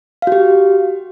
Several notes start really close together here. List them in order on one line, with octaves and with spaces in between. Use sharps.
F5 F#4 G4